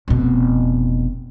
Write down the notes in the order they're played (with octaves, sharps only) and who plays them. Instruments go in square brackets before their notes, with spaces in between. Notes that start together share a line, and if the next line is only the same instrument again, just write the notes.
[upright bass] F1 B2